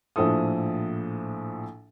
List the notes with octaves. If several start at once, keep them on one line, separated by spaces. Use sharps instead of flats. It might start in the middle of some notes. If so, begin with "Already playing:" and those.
A#1 A2 F3 E4 A4 D#6